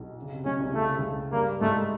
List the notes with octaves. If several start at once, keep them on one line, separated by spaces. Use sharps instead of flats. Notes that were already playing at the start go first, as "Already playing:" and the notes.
Already playing: B1 B2
C#3
C3
B1 B2 C#4
C2 C3
C#3 A3
C3
C#2 C#3
G2 G3 A#3
G#2 G#3 A3